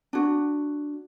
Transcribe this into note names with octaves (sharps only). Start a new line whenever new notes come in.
D4 F#4